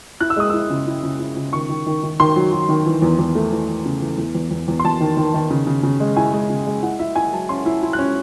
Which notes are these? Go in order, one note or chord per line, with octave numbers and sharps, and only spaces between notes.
E4 F#6
E6
G#3 D#6
E4 E6
C#3
E4
C#3
E4
C#3
D#3 C#6
D#3
D#3
D#3
D#3 C6
F#3
F#3
D#3
E3
E2
E2
A3
E3
E3
C#3
E3
E2
E2
E2
E2
C6
E2 A5
D#3
D#3
D#3
C#3
C#3
C#3
G#3
E4 G#5
G#3
C#3
G#3
E4 F#5
E4 E5
E4 G#5
F#3 A5
C#4 C6
E4
E4
F#6
C#4